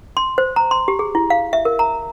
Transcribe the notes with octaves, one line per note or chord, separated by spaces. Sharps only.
C6
C5
A#5
C6
G4
G#4
E4
F5
E5
A#4
A#5